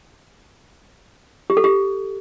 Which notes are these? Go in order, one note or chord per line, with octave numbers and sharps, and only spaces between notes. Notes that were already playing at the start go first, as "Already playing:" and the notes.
G4
A4
G4